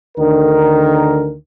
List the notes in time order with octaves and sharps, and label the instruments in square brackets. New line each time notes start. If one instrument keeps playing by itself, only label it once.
[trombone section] D2 D3 D#3 A#4